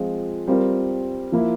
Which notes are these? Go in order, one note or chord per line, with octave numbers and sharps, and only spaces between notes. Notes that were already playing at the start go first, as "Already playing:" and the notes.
Already playing: F3 G#3 C4 F4
G3 C4 F4 A#4
F3 A#3 E4